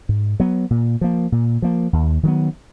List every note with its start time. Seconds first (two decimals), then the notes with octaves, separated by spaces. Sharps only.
0.09 G#2
0.40 F#3 B3
0.70 A#2
1.01 F3 A#3
1.32 A#2
1.62 F3 A#3
1.93 D#2
2.23 D#3 F#3 B3